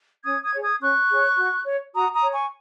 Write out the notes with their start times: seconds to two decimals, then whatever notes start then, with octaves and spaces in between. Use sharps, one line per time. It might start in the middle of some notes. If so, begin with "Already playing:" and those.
0.24 C#4 D#6 G#6
0.44 D#6 G#6
0.53 G#4 C#5
0.62 D#6 G#6
0.81 C#4 C#6 F#6
1.10 G#4 C#5
1.37 F#4
1.66 C#5
1.94 F#4 A#5 D#6
2.13 A#5 D#6
2.22 C#5
2.32 G#5 C#6